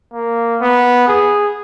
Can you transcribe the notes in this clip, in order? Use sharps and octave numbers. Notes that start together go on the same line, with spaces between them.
A#3
B3
G#4